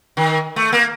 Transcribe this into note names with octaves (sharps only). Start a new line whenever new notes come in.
D#3
A3
A#3